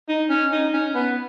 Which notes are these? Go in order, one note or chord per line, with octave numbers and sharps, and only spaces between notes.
D#4
C#4
D#4
C#4
B3